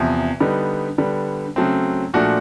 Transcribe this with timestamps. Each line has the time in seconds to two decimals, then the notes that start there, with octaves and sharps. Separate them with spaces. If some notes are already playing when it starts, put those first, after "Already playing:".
Already playing: E2 C3 F3
0.40 D3 G3 B3 D#4
0.98 D3 G3 B3
1.56 C#3 F#3 A3 C4
2.14 A#2 F3 A3 D4 F#4